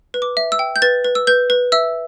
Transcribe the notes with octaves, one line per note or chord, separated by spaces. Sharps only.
B4
D6
E5
E6
G5
G6
B4 A6
B4
E6
B4 G6
B4
E5 E6